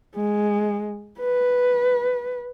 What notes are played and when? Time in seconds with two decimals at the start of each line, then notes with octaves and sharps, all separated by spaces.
0.16 G#3
1.20 B4